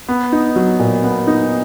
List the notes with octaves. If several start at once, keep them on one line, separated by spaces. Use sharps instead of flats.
B3
D#4
F#3
A#2
B3
D#4